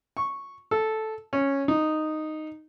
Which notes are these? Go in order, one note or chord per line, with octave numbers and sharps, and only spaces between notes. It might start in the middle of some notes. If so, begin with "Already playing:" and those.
C#6
A4
C#4
D#4